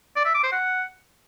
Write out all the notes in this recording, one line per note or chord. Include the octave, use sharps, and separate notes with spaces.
D5
E5
D6
C5
F#5